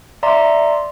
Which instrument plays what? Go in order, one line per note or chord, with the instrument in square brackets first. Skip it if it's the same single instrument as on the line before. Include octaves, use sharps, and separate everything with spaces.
[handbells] D5 E5 A#5 C6